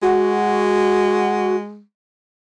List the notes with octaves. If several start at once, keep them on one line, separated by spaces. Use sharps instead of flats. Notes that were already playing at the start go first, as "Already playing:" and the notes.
G#3 F#4